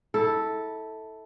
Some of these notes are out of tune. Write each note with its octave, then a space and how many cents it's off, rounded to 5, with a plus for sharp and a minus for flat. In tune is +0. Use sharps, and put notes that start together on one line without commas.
E4 -30 A4 +0